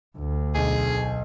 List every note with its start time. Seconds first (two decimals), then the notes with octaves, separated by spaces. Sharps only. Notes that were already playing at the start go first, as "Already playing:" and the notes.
0.18 D2
0.54 B1 G#4